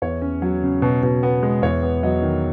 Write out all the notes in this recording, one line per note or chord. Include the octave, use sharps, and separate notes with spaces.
E2 C#5
C#4
F#3
C#3
B2
B2
B3
G#3
E2 C#5
B3
F#3 D#5
D#3